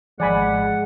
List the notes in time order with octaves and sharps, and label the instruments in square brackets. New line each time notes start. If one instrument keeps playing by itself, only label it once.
[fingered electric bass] G#1 F3 [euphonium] G#3 [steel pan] D5 G#5 B5 [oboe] F#5